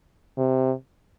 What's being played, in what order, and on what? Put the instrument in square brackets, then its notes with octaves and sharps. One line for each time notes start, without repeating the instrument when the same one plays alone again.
[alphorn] C3